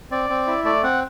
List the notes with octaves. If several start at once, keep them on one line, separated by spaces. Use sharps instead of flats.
C4 D5
C4
E4
A3 D5
C4 F#5